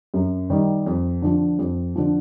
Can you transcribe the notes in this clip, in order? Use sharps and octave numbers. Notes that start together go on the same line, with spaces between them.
F#2
D#3 G3
F2
D3 F3
F2
D3 F3